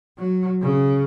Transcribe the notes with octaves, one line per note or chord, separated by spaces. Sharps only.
F#3
C#3